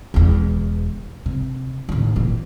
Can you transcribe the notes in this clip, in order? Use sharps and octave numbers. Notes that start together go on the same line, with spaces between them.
E1 E2
C3
A1 D#2
A#2 E3